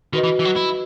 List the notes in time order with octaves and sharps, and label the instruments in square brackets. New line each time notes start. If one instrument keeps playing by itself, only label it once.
[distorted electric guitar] D#3 [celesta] F#4 B4 D#5
[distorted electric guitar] E3
E3
F#3
E4